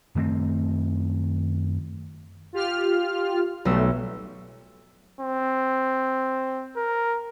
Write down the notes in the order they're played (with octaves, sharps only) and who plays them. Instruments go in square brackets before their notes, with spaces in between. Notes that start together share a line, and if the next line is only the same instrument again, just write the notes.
[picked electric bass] F#2 D#3 A3 C4
[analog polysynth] F4 G4 F6
[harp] B1 B3 E6 [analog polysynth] G3 A3
[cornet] C4
A#4